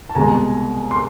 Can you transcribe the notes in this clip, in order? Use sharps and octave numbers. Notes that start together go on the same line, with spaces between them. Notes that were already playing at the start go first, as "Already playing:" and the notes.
A5
C2 B2 G#3 C4 G#5 A#5
C6